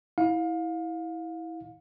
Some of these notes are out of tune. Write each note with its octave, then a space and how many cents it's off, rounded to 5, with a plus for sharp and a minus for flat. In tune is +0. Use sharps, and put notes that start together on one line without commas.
E4 -20 F5 +30